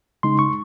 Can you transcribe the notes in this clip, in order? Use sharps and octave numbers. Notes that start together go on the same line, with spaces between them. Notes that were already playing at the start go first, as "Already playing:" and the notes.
C#3 G#3 D#4 C6
C#6